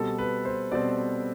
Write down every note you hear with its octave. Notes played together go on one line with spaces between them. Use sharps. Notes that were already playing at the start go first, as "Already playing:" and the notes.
Already playing: B2 G3 C4 A4
B4
C5
B2 G3 C4 D5